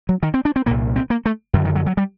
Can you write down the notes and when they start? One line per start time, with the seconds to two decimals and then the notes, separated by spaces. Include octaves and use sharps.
0.09 F#3
0.23 D#3
0.34 C4
0.45 D4
0.56 C4
0.66 C2 A#2 A#3
0.96 C4
1.10 A#3
1.26 A3
1.53 F#2 D3
1.65 D#3
1.76 F#3
1.86 F#3
1.97 G3